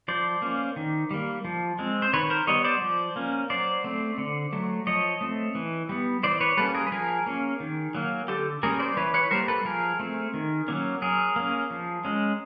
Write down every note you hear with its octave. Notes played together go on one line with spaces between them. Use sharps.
F3 C5 D5
A#3 C#4
D#3
G3 A#3
F3
G#3 C4
C5
D#3 B4 C#5
A#4 C5
G3 B3 C#5 D#5
C5 D5
F3
A#3 C#4
F#3 C5 D5
A3 C4
D3
F#3 A3
F3 C#5 D#5
A3 C4
E3
G3 B3
E3 C5 D5
B4 C#5
G3 A#3 C#4 A4 B4
G#4 A#4
B4
F3 G#4 A#4
A#3 C#4
D#3
F#3 A#3
D3 G4 A4
G3 A#3 C#4 G#4 A#4
C5 D5
E3 B4 C#5
B4 C#5
G3 A#3 A#4 C5
A4 B4
F3 G#4 A#4
A3 C4
D#3
F#3 A#3 C#4
F#3 G#4 A#4
A#3 C#4
F3
G#3 C#4